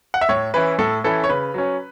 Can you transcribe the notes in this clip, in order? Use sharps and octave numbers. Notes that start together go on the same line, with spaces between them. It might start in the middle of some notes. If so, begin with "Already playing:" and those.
F#5
E5
A2 C#5
E3 C#4 E4 B4
A2 A4
E3 C#4 E4 A4
C#5
C#3 B4
F#3 C#4